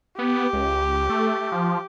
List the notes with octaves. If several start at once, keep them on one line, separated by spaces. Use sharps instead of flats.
B3 G4
C#2
A3
F3